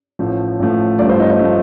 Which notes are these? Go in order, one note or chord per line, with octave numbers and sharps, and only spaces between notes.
A1 A2 F3 A3
A1 A2 F3 A3
A1 G2 F3 A3 D5
C5
D#4
D#4
F3 A3